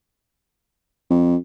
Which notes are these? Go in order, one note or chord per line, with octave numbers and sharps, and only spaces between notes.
F2